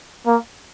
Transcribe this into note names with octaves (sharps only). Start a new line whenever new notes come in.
A#3